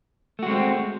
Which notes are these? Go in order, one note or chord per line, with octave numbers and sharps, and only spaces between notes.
G#3 A3 C4 F#4